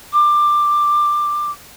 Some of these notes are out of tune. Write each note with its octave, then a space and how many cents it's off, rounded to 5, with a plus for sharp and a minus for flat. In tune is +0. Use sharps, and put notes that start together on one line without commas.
D6 +15